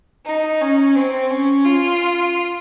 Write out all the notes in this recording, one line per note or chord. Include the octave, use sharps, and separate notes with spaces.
D#4
C#4
C4
C#4
F4